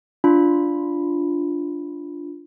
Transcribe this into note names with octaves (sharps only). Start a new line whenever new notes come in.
D4 F4 B5